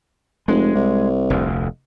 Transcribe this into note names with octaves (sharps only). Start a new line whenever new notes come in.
F1 G#3
C2
F1 D2